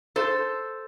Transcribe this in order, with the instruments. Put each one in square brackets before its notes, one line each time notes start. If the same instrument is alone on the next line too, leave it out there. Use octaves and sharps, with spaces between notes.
[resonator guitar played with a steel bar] A4 C5